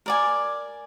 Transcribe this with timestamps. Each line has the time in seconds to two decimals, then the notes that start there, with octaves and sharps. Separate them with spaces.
0.06 A#4 D5 G#5